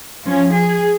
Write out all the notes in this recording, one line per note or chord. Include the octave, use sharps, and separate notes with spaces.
F3 C#4
G#4